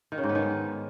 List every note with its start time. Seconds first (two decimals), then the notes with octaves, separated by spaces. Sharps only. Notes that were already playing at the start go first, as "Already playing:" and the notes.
0.12 D#3
0.18 C#3
0.24 G#2
0.29 B3
0.35 D#3